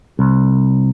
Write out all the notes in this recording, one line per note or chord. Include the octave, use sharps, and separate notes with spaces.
C2